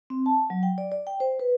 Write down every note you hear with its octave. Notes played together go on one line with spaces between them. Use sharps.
C4
A5
F#3
G5
D5
D5
G5
C5
B4